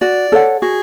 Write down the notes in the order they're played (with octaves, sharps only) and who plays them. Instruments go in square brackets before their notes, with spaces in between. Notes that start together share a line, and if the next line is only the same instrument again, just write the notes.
[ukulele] F#4 [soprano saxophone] D5
[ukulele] A4 C#5 F#5
[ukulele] F#4 [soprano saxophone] G#4